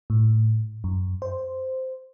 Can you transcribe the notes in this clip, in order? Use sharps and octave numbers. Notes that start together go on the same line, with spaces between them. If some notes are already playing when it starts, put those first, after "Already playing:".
A2
F#2
C5